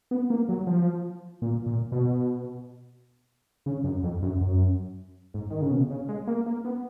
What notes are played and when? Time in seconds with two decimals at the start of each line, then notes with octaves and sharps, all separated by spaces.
0.11 B3
0.30 A#3
0.49 F#3
0.67 F3
1.42 A#2
1.66 A#2
1.92 B2
3.66 C#3
3.84 F#2
4.03 F2
4.22 F#2
4.41 F#2
5.34 G#2
5.51 D#3
5.62 C#3
5.71 B2
5.90 C#3
6.09 G#3
6.27 A#3
6.46 A#3
6.65 B3